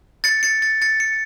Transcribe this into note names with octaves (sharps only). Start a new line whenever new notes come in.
A6 C#7
A6 C#7
A6 C#7
A6 C#7
C#7